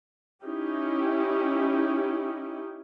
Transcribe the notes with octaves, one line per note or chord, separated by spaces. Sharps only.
C#4 D#4 E4 G4